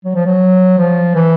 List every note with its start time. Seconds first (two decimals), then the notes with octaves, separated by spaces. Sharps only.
0.05 F#3
0.15 F3
0.26 F#3
0.78 F3
1.15 E3